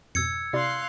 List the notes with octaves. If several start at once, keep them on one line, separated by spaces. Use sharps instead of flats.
F2 G#2 B2 E6 G#6 C#7
C3 E4 D5 F5 C6 F#6